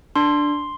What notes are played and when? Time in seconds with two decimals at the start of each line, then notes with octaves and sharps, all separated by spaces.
0.16 D4 C6